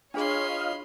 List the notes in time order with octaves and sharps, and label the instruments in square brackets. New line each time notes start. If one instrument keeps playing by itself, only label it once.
[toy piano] D4 G#4 [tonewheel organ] F4 D#5 F5 [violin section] C#5 [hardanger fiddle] B5 C6